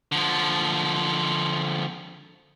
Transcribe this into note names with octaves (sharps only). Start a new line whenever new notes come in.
D3 F3